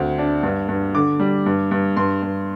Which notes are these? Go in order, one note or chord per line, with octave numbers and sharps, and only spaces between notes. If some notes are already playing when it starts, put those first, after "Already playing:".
Already playing: D2 C4
D4
G2
G2
D3 D6
G3
G2
G2
G2 C6
G2